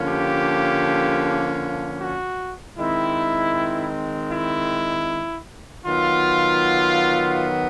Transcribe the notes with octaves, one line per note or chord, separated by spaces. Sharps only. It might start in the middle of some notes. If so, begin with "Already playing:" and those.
Already playing: D3 F3 A#3 C#4
G4
F#4
D#3 G#3 C4 E4
E4
D#3 F#3 B3 F4